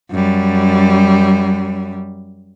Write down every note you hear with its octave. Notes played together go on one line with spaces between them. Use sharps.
F#2 G3